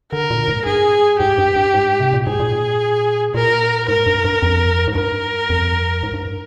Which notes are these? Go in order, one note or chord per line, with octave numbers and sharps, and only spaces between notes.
D3 A#4
A#2
G#2
G2 G#4
G#2 G4
G2
G2
G#2
C3
A#2
G#2 G#4
A#2
A#2 A#4
G#2 A#4
G2
G2
F2
G#2
G2 A#4
F2
G#2
G2